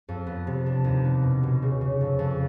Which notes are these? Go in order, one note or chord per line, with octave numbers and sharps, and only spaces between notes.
F2
B3
C3
D4
D#2
B3
B2
B2
C#3
C#3
F2
F2